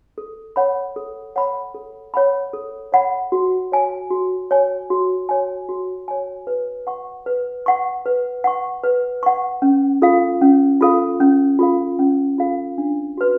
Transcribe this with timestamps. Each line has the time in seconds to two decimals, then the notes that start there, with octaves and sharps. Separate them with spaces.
0.18 A4
0.56 C#5 F#5 B5
0.96 A4
1.36 C#5 F#5 B5
1.74 A4
2.14 C#5 F#5 B5
2.53 A4
2.92 C#5 F#5 B5
3.32 F#4
3.72 C#5 G#5
4.10 F#4
4.51 C#5 G#5
4.90 F#4
5.29 C#5 G#5
5.69 F#4
6.08 C#5 G#5
6.47 B4
6.87 F#5 C#6
7.26 B4
7.66 F#5 C#6
8.06 B4
8.44 F#5 C#6
8.84 B4
9.23 F#5 C#6
9.62 C#4
10.02 F4 A4 F5
10.41 C#4
10.81 F4 A4 F5
11.20 C#4
11.59 F4 A4 F5
11.99 C#4
12.38 F4 A4 F5
12.78 D4
13.18 F#4 B4